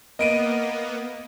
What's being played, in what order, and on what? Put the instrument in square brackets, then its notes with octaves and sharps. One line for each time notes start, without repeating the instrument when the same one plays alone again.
[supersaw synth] A#3 B3 [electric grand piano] D#5 D7 D#7